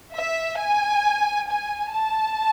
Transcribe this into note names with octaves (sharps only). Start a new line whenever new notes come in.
E5
G#5
G#5
A5